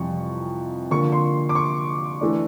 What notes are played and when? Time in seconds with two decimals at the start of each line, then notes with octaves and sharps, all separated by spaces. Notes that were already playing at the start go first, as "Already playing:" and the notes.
Already playing: F2 C3 E3 G3 C#6
0.91 D3 F3 A#3 C#6
1.12 C6
1.49 D6
1.55 C#6
2.21 E3 A3 D4